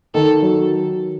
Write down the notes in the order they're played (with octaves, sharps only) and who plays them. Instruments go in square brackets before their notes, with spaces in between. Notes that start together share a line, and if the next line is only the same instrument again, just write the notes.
[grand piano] D#3 [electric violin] A4
[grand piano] F#3